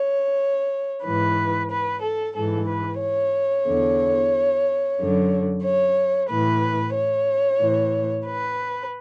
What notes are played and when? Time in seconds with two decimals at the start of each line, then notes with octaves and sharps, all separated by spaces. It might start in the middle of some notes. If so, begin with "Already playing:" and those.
Already playing: C#5
1.04 G#2 E3 B4
1.70 B4
2.02 A4
2.35 G#2 E3 A4
2.67 B4
3.00 C#5
3.66 E2 D3
4.98 F#2 D3
5.64 C#5
6.29 A2 E3 B4
6.94 C#5
7.60 A2 E3
8.26 B4